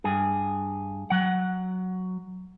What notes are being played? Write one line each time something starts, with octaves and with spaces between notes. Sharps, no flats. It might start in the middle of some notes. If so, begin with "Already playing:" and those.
G2 G#4
F#3 F#5